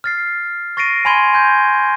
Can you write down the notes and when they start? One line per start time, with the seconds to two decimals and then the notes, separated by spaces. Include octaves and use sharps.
0.04 F6 A6 C7
0.77 C#6 A6 A#6 C7 D7 D#7
1.05 G#5 B5 C6 G#6 D#7 G7
1.34 G#5 G6 G#6